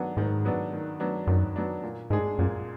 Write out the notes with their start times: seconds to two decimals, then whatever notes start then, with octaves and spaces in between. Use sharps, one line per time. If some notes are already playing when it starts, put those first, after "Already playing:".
Already playing: D#3 F#3 B3 D4
0.17 G#2 D#3
0.45 F#3 B3 D4
0.73 D#3
1.00 F#3 B3 D4
1.27 F#2 D#3
1.56 F#3 B3 D4
1.83 A#2
2.10 G#2 G#3 D4 G#4
2.39 F#2 A#2